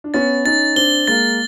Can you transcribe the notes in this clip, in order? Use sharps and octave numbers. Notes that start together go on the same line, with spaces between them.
D4
B3 C#4 A6
C#4 D#4 A6
C4 D4 G7
G#3 A#3 A6